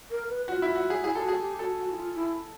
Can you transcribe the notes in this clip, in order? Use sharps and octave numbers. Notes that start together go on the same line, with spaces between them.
A#4
B4
F4 F#4
E4
F#4
G#4
E4 G#4
G4 A4
F#4
G#4
G4
F#4 A4
F#4
E4
F4
E4